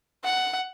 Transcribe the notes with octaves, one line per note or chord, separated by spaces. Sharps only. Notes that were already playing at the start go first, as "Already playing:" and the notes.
F#5